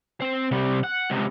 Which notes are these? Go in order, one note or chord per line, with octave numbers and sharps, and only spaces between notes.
C4 C5
C3 G3
F#5
C#2 C3